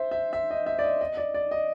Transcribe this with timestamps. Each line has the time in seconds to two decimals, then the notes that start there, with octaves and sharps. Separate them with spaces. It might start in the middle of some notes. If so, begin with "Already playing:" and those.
Already playing: C5 E5
0.11 E5
0.33 E5
0.51 D#5
0.66 E5
0.79 D5
0.83 D#5
1.01 D#5
1.17 D5
1.34 D5
1.51 D#5